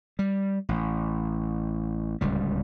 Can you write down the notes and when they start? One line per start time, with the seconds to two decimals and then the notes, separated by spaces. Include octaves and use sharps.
0.19 G3
0.69 A1
2.21 D1 C#2 G3